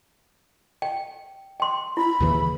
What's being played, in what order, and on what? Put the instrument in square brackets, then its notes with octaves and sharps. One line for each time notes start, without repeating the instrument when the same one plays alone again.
[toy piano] G5
G5 C6
[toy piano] E4 [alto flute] B5
[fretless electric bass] D#2 C#3 E3